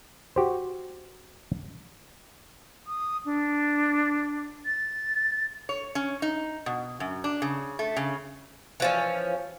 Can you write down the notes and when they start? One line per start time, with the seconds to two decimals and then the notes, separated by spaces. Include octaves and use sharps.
0.36 F#4 G4 C5
2.87 D#6
3.25 D4
4.66 A6
5.69 C#5
5.95 C#4
6.22 D#4
6.66 B2
7.00 F#2
7.24 D4
7.42 C#3
7.79 A3
7.97 C#3
8.80 E3 F3 C#4